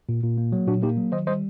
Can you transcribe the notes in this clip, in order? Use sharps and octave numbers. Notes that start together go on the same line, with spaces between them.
A#2
A#2
A#3
F#3
A#2 D4 F#4
A#3 D#4 G4
F#3
D#3 C5 D#5
G3 C5 D#5